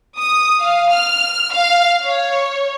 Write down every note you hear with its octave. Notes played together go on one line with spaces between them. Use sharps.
D#6
F5
F6
F5
C#5